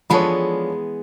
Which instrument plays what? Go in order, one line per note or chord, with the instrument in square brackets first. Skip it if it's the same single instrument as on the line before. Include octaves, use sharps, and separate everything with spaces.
[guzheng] E3 G#3 B3 [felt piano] F3 B5 [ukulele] D4 A4 C#5